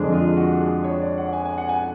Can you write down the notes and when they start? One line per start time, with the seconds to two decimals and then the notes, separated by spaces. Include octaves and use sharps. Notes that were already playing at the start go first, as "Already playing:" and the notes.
Already playing: F2 D3 G#3 D4 G#4
0.12 F4
0.37 F#4
0.60 G#4
0.84 C#5
1.02 D5
1.18 F#5
1.33 G#5
1.45 G#5
1.58 F#5
1.69 G#5